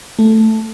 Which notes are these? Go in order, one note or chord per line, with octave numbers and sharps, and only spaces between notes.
A3